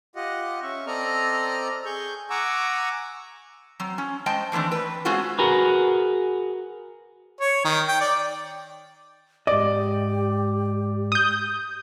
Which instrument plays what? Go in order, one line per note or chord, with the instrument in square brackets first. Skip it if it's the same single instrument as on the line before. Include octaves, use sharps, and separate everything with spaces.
[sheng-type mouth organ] F4 G4 D#5 F#5
C#4 E5 C#6
C4 A4 D5 D#5 A#5 F6
G#4 C#6 G6
F#5 G#5 A#5 C#6 D6 E6
[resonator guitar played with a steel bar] F#3 C4
C#4
G#3 C5 D#5 G5 A5
D#3 E3 A3 C4 D4
B4
G#3 C4 C#4 F4 F#4 A4
[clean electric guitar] F#4 G#4 A#4 B4
[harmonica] C#5
D#3
G5
D5
[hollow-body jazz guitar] G#2 D#5 [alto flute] G4 [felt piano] D5
[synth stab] D#6 G6